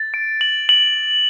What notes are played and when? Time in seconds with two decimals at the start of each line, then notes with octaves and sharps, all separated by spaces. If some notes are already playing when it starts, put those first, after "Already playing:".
Already playing: A6
0.14 D7
0.41 F#7
0.69 F#7